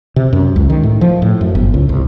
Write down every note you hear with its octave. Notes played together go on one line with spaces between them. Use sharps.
C3
F#2
C#2
D#3
A2
F3
A2
F#2
G1
C#2
C2